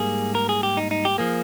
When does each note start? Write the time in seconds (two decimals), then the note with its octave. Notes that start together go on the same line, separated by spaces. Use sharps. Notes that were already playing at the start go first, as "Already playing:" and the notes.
Already playing: G#2 G3 A#3 G#4
0.35 A#4
0.49 G#4
0.63 G4
0.77 D#4
0.91 D#4
1.05 G4
1.18 F3 A#3 G#4